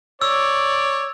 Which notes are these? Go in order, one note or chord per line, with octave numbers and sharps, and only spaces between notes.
C#5 D5 E6